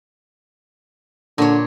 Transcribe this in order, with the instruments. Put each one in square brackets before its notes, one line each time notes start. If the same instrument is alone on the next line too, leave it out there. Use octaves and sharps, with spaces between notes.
[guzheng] A#2 D4 C#5 [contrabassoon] D3